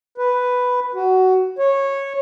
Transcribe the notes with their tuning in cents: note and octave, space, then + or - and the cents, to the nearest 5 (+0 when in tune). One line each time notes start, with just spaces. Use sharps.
B4 +5
F#4 +15
C#5 -15